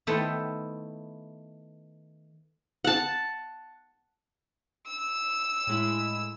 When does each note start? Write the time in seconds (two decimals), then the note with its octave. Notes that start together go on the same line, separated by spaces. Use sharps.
0.07 D#3 A3 B3 E4 C5 G5
2.84 F#5 A5
4.86 E6
5.67 A2 G#3 E4